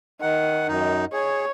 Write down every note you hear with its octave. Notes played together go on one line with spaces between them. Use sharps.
D#3 F#5
F#2 D#4
G#4 C#5